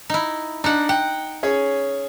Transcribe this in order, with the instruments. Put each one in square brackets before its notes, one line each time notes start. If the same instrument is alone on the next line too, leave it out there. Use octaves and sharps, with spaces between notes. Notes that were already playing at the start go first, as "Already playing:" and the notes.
[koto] D#4 E4
[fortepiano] D4 [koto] D#4 F#5
[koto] F#5 [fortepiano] G5
[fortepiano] C#4 G#4 C#5